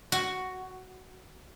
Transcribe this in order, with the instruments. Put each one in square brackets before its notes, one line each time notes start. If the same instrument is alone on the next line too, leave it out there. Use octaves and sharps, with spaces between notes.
[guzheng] F#4